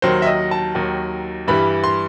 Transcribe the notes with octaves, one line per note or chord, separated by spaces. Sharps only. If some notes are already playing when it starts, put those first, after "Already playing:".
D#2 D#3 F#3 C5
E5
D#5
A5
D#2 D#3 F#3
G2 E3 G3 B5
C6